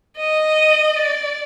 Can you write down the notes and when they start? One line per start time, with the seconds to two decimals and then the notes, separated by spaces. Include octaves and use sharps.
0.17 D#5
0.97 D5